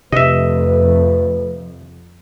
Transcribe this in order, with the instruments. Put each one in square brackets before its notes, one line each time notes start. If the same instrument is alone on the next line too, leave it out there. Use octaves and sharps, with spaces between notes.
[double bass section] F2 [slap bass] C3 [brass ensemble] A3 B4 [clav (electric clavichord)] D#5 E5